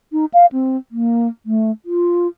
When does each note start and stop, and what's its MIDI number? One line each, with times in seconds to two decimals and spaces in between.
0.12 0.25 63
0.34 0.46 77
0.52 0.77 60
0.91 1.28 58
1.46 1.71 57
1.85 2.27 65